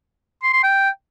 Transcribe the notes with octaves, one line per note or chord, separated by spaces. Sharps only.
C6
C6
G5